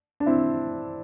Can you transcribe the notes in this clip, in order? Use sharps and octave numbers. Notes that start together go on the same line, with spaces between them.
D4
C4 E4